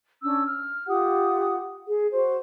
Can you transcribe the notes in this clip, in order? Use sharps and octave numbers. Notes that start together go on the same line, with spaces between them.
C#4 D4 E6
F6
F4 G4 F#5 D#6
G#4
F#4 C5